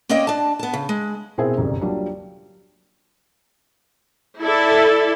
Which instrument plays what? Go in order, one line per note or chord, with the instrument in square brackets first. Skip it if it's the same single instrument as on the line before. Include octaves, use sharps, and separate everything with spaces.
[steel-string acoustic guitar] A#3 C4 C#4 D5 D#5 G5
D4 A5
B3 A5
C#3
G#3
[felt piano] B2 C4 E4 G#4 A#4 E5
G1 C2 F#2
F#3 G3 A#3 D4 F4
[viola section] E4 A4 D5 E5